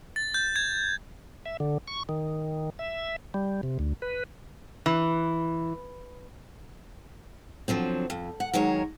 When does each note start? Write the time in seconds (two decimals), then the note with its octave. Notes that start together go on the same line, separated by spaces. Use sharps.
0.16 A6
0.34 G6
0.56 G#6
1.45 E5
1.60 D3
1.88 C#6
2.09 D#3
2.79 E5
3.34 G3
3.63 C3
3.79 D2
4.02 B4
4.86 E3
7.68 D3 F3 F#3 C4
8.10 F2
8.40 F#5
8.53 D#3 F#3 G#3 A#4 C#5